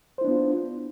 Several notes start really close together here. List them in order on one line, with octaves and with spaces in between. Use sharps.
C5 E4 D4 B3 F4